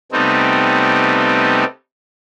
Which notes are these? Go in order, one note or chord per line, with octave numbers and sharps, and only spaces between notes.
C3 G3 A3 B3 C4 D#4